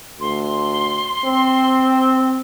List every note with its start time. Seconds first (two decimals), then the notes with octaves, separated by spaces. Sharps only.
0.20 D2 C6
1.25 C4